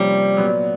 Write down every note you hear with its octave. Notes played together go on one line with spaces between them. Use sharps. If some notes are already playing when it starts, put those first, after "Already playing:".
Already playing: C3 F3 G3 A#3 C#4
A#2 F#3 B3